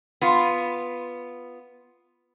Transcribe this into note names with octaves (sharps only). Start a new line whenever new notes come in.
B3 F4